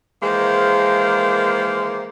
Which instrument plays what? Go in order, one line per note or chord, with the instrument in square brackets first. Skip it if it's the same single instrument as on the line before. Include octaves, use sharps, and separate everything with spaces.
[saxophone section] D#3 E3 G#3 A#3 A#4 C5